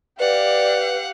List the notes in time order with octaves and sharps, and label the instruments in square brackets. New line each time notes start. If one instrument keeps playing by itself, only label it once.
[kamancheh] G4 F5 [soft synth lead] B4 [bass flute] D5 [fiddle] F#5